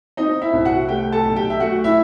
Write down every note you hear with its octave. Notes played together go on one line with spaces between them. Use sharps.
C4 D#4 D#5
E4 E5
C2
F#4 F#5
A3 G4 G5
A4 A5
B1
G4 G5
E5
A3 F#4 F#5
E4 E5